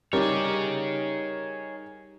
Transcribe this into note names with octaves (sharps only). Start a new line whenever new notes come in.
G3 D#4 G4 G#4 A#4 C#5